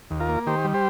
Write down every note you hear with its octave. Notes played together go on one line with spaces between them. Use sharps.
D#2
F4 A#4
A#3
D#3 G4 C5
G3
G4 C5